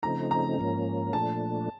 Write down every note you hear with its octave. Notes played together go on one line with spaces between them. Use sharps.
C#3 F3 A3 C4 D#4 A#5
A#5
G#2 F3 A#3 C#4
A#2 F3 A3 D4 A5